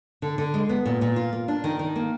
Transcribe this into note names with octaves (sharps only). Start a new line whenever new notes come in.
D3
D3
G#3
B3
A#2
A#2
F4
A#3
D4
D#3
D#3
A#3